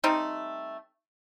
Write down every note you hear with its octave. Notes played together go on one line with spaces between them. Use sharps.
G3 A3 C4 D#4